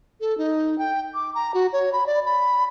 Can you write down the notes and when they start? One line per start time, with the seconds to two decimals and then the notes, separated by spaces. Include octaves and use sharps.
0.21 A4
0.38 D#4
0.78 G5
1.14 D6
1.35 A#5
1.54 F#4
1.73 C#5
1.93 B5
2.07 D5
2.26 B5